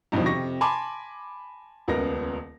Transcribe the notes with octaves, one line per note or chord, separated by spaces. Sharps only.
E2 G2 B2 D#3 F3
F2 C3 C#6 A#6
G#5 A5 B5 C6 D6
D#1 C#2 B3 A#4 A#6